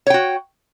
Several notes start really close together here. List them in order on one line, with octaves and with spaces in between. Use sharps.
C#5 G5 F#4